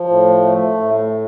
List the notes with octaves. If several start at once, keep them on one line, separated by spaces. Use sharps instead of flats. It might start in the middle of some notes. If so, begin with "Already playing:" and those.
Already playing: F3
A2
A3
A2